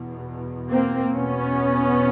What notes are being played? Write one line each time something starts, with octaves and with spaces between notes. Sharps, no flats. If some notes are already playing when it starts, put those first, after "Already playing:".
Already playing: E2 B2
A#3 C4
E2 B2 B3 C#4